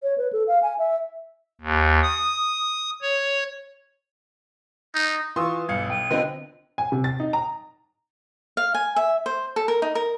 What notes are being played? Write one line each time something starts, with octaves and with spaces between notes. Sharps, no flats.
C#5
B4
A4
F5
G#5
E5
D#2
D#6
C#5
D#4
E3 F4 C6 C#6 D#6 E6
B1 G2 F5 G#6 C#7
G5 D#7
D3 B3 C4 F4 B4 D#5 G5
G#5
C3
A6
D#4
A#5
F5
G#5
E5
C5
A4
A#4
D#4
A#4